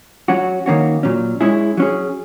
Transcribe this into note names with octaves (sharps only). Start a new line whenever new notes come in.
F#3 C#4 F#4
D#3 A#3 C#4 F#4
A#2 F#3 C#4
G#3 C#4 E4 G#4
F#3 C#4 G#4